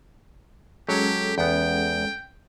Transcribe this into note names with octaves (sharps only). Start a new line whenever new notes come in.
F#3 G#3 C#4 G4 A4 C#5
E2 B3 G5